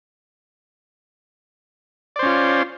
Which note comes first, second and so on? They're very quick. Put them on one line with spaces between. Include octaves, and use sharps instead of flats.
D5 C5 C#4 F4